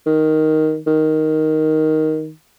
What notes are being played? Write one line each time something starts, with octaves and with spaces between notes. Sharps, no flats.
D#3
D#3